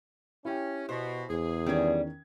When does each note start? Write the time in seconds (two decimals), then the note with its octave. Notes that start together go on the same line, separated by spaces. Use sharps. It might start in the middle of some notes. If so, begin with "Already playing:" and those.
0.45 C#4 E4 G4 G5
0.89 B2 C5
1.30 E2 G#4
1.66 D#3 G3 C#4 D4 G#6